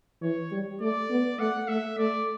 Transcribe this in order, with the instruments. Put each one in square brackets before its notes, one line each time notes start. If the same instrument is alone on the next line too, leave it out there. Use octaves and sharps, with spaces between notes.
[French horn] E3 [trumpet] C#5
[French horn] G3
[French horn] A3 [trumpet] D5
[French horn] B3
[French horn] A3 [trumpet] F#5
[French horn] A3 [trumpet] E5
[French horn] A3 [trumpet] D5